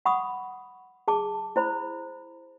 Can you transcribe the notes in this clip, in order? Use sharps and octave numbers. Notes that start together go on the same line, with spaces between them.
F#5 B5 C#6 D#6
G#4 A5 D6
E4 C5 B5